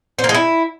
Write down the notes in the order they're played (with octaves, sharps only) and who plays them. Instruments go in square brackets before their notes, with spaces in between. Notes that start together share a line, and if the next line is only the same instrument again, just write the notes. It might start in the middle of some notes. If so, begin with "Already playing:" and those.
[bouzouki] C5
A#3
G#3
E4